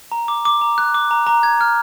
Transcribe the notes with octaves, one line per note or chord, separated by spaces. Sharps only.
A#5
D6
D6
A#5
F#6
D6
A#5
A#5
G#6
F6